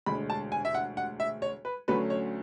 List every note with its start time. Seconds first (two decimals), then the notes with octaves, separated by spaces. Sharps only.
0.06 E1 D2 D3 G#3 B5
0.30 A5
0.52 G#5
0.65 E5
0.75 F#5
0.97 F#5
1.20 E5
1.42 C#5
1.65 B4
1.88 D2 D3 F#3 A3 C#4 B4
2.10 C#5